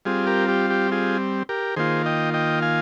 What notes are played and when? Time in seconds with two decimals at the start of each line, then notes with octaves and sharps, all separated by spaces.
0.05 G3 C4 F4 G#4
0.26 G4 A#4
0.48 G4
0.70 G4
0.91 F4 G#4
1.49 G4 A#4
1.77 D#3 A#3 F4 G#4 C5
2.06 D#5 G5
2.34 D#5 G5
2.62 F5 G#5